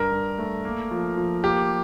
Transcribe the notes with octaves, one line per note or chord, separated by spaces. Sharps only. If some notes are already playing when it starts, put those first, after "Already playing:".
Already playing: G2 A#4
G2
A3
A#3
F3
F3
A#3 G4